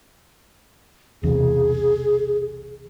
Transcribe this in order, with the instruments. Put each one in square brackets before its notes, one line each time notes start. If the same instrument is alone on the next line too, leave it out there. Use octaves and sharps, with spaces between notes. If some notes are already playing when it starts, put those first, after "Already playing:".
[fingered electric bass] B1 E2 C3 [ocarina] G#4